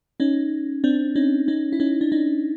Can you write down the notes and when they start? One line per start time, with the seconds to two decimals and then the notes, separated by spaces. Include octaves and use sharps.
0.20 C#4 D#4
0.84 C4 D4
1.16 C#4 D#4
1.48 C#4 D#4
1.73 E4
1.80 C#4 D#4
2.01 D4
2.12 C#4 D#4